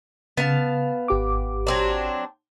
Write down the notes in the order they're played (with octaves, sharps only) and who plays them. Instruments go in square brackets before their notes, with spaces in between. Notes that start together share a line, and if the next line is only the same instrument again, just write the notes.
[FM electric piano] C#3 [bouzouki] B3 F5 A5
[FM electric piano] G#1 G4 D6
[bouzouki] F#3 C4 D4